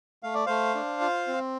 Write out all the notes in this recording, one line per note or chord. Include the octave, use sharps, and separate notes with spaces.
A3 F5
D5
A3 C5 F5
D4
F4
C4